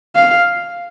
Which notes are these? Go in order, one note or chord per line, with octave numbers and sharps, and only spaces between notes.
F5